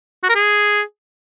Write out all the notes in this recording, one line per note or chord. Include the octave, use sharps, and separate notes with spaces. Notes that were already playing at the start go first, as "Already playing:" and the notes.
F#4
A#4
G#4